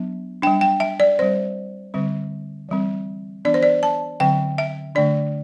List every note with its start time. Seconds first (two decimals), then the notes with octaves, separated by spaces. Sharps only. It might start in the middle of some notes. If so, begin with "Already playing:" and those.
Already playing: F#3 B3 D4
0.42 D4 G5
0.47 G3
0.61 G5
0.80 E5
1.00 D5
1.19 G3 C4 C5
1.94 D3 G3 C4
2.69 E3 G3 C4
3.45 E3 B3 D4 D5
3.54 C5
3.63 D5
3.83 A5
4.20 D3 F#3 C4 G5
4.58 E5
4.95 D3 A3 D4 D5